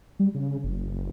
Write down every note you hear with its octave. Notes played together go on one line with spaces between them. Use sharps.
G3
C#3
F#1